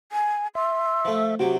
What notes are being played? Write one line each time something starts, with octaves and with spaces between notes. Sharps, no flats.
G#5
E5 C6
F3 A3
C3 F#3 F#4 G4